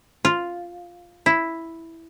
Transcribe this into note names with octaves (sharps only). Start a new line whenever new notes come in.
F4
E4